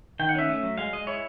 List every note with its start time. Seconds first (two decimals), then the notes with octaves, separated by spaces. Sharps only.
0.19 D#3 G5
0.29 F#5
0.35 C#4 E5
0.49 A3
0.63 F#3
0.78 G#3 F5
0.93 G#3 D#5
1.07 E4 C#5